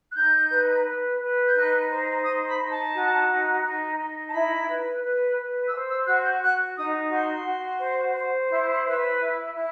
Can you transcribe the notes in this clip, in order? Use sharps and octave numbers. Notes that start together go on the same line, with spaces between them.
F#6
D#4 G6
B4
B4
B4
G6
D#4 F#6
C5
D#4 D#6
B5
D#4
A5
F#4
D#4
D#4
D#4
A5
E4 B5
B4
B4
B4
E6
C5 D#6
E6
F#4 F#6
G6
F#4 F#6
D#4 D#6
F#4 C6
F#4
C5
C5
E4
B4
E4
E4